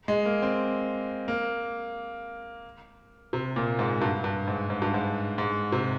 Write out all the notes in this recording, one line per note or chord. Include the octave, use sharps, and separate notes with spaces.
G#3
A#3
C4
A#3
C3
A#2
G#2
G2
G2
G#2
G#2
G2
G#2
G#2
C3